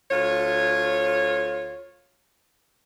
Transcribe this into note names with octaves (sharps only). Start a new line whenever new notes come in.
D2 F4 C#5